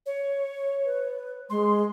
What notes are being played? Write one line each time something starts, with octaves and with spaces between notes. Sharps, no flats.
C#5
B4
G#3 C6